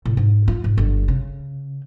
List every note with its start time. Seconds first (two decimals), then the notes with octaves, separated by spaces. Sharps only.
0.05 A2
0.17 G#2
0.48 F4
0.64 G#2
0.78 G1
1.08 C#3